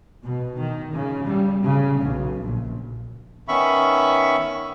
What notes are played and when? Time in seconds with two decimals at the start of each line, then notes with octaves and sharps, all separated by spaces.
0.23 B2
0.58 D#3
0.94 C#3
1.26 G3
1.63 C#3
2.02 B1
2.40 A#1
3.48 D#3 B3 C#4 E5 B5 C#6